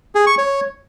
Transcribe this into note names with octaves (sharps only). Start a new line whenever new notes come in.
G#4
C#6
C#5